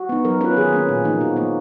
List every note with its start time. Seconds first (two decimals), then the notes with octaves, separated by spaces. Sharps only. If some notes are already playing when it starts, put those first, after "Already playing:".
Already playing: F#4
0.09 B3 D#4
0.25 F#3 A#4
0.41 C#4 F4 B4
0.57 D#3 G#4
0.73 A#3 C#4
0.89 A#2
1.04 F3 A#3 D#4
1.21 B2 F#4
1.36 A#3 D#4